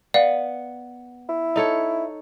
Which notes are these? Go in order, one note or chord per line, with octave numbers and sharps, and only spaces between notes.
B3 D5 F5
E4
D#4 A4 C#5